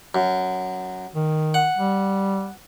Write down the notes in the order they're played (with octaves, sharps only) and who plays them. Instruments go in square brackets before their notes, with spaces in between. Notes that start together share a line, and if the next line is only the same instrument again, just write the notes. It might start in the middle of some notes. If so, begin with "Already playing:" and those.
[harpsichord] F#2
[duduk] D#3
[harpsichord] F#5
[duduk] G3